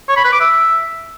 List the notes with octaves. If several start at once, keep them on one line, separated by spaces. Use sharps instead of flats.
C#5
B5
B4
D6
E5